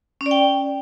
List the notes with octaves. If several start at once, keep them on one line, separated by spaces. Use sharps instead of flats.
C#4
D5
G5